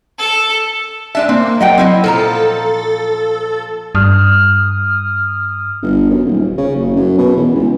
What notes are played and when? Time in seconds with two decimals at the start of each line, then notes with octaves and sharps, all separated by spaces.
0.19 A4
1.15 G#3 D4 E5 A5
1.29 A#3 C4
1.60 F#3 D#5 F#5 G5
1.78 C4 E4 D#5
2.04 A#2 F3 A4 A#5
3.95 G2 D#6 F6
5.82 G1
6.10 F#2
6.26 D#1
6.57 C#3
6.76 F#1
6.96 F#2
7.18 B2
7.37 E2
7.55 C#2